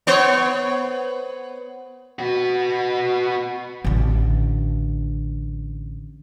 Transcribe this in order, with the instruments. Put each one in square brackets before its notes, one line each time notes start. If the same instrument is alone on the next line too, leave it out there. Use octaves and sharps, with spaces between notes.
[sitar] B3 C5 C#5
[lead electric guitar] B3 F#4
[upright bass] A1 D3